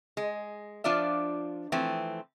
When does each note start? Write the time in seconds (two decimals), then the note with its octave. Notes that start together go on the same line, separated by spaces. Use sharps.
0.17 G#3
0.84 F3 D4 F4 D5 E5
1.72 E3 F3 A3 C4